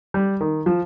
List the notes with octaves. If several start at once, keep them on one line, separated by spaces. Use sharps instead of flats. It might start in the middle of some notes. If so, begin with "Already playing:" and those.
G3
D#3
F3